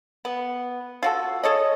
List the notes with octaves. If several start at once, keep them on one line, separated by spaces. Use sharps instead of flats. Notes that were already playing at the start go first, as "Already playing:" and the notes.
B3
F4 F#4 A4
G#4 A4 C#5 D#5